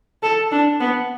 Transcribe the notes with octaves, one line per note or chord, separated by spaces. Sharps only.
A4
D4
B3